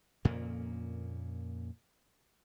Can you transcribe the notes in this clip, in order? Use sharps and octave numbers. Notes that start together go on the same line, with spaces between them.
F2 A#2 C#3 A#3